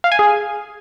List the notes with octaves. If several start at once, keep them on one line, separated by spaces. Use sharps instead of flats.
F5
G#5
G#4